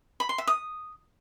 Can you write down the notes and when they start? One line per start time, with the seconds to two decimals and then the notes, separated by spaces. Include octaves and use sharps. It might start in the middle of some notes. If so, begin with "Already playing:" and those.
0.20 B5
0.29 C6
0.38 E5
0.47 D#6